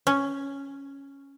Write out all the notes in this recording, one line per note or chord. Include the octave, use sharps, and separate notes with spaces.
C#4